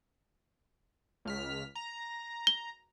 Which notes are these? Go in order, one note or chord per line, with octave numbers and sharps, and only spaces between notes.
C#2 F6 B6
A#5
G7